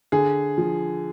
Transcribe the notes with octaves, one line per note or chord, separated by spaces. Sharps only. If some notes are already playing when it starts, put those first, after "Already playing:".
D3 G#4
F3